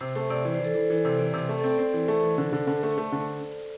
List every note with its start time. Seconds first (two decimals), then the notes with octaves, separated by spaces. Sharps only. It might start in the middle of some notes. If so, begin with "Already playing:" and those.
0.01 C3 C5
0.15 A3 C5
0.30 C3 D5
0.45 E3 D5
0.54 C5
0.60 E3 A4
0.74 E3 C5
0.90 E3
1.05 C3 C5
1.19 E3 D5
1.33 C3
1.39 C5
1.49 A3
1.59 A4
1.63 C4
1.71 D5
1.78 C4 C5
1.94 E3
2.08 A3
2.23 E3
2.38 D3
2.53 D3
2.67 D3
2.83 A3
2.98 A3
3.12 D3